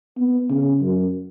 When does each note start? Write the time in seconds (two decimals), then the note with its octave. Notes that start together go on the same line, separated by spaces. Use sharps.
0.18 B3
0.50 C#3
0.82 F#2